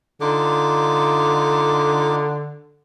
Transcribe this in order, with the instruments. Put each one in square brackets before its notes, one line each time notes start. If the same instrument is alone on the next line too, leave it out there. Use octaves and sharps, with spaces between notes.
[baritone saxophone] D3 [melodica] D#4 F4 D6